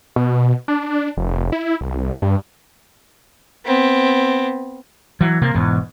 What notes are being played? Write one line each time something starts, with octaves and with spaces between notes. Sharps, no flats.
B2
D4
F1
E4
C2
G2
B3 C4
E3 F#3
C3 A#3
E1 E2 G#2